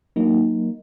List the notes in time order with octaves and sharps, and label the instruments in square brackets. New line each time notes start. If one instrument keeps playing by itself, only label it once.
[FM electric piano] F#3 A#3 D#4